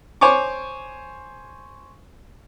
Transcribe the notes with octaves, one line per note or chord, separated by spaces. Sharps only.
C5 C#5 G#5 C#6 D6